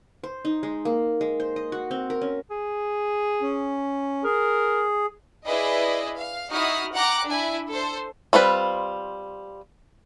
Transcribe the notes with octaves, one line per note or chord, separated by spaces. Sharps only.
C5
D#4
G#3
A#3
G#3
C5
D#5
F#4
C4
A#4
C#4
G#4
C#4
G#4 A#4
E4 G#4 B4 D5 D#5
F5
D#4 E4 F#4 D#6 F6
F#5 G5 A#5 D6 F#6
D4 E4 G#5
A4 C5
G3 C4 F4 B4